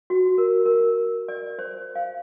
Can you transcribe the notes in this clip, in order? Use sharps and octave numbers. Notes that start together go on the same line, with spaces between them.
F#4
A#4
A#4
D5
C5
F5